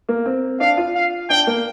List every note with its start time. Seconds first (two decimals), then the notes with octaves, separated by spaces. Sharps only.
0.09 A#3
0.26 C4
0.60 D4 F5
0.77 F4
0.95 F5
1.30 D4 G5
1.47 A#3